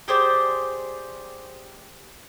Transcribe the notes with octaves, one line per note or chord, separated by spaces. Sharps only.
G4 G#4 C5 D5